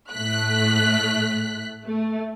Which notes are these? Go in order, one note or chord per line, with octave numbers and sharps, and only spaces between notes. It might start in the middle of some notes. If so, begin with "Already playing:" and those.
A2 A3 F#6 B6
A3